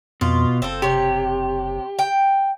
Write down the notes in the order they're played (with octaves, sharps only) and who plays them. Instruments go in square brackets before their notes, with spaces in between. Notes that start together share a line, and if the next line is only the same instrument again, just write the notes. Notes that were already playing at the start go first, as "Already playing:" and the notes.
[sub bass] F2 [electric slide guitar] B2 [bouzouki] F4
[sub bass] F#1 [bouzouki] C4 F4 A4
[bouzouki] C3 C#5 [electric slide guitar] G4
[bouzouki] G5